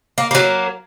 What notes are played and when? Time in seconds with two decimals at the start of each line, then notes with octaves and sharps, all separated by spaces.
0.18 A#3
0.31 F#3 A#3